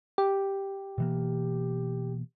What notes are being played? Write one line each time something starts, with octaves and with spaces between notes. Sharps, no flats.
G4
B2 E3 A#3